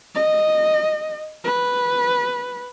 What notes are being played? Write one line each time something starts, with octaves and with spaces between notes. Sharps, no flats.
D#5
B4